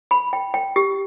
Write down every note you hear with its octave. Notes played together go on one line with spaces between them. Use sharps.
B5
G5
G5
G4